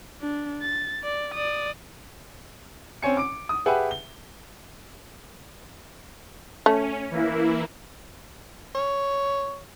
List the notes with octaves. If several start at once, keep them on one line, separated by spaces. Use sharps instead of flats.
D4
A6
D5
D5 D#6
C4 C#4 C#5 G#5 C#7
D6 D7
D#6
G4 G#4 B4 E5 F#5 G#5
G7
A3 C#4
E3 A#3 E4
C#5